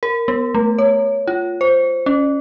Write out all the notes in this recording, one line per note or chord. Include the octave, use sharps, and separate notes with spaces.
A#4
B3
A3
C#5
F4
C5
C#4